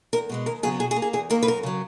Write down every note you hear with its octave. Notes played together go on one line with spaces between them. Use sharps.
E2 A#4
B2 G#3 B3
D#2 A#4
C#3 F#3 B3 G#4
B2 G#4
G#4
A#3
G#4
E2 G#4
D#3 A#3 A#4
B4
F#2 A#4
C#3 F#3